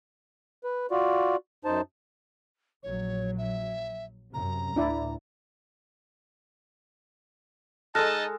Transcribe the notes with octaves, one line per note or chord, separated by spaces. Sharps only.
B4
F4 F#4 D5
F#2 D#4 C5 A5
A#1 F#3 C#5
E5
F#2 C3 A#5
D2 A2 D4 E4 D5
G#3 D#4 A4 D#5 A5 F6 F#6 A#6